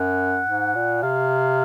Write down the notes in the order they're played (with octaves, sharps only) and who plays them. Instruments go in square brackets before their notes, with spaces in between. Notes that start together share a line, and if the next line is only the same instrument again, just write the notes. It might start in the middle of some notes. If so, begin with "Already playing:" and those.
Already playing: [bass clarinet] F#2 [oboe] F#5
[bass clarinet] G#2
A#2
[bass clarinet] C3 [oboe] F5